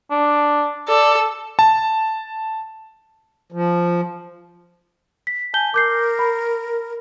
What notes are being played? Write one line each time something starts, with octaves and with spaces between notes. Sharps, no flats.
D4
A4 D5
A5
F3
B6
G#5 A5 G6 G7
A#4 D6 G6 C7
B5